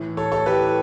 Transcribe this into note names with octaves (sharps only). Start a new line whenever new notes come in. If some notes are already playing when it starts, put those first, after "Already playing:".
Already playing: A2 E3
A4 C#5
A4 C#5
G4 B4